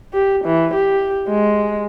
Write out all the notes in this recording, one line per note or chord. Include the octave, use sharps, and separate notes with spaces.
G4
E3
G4
G#3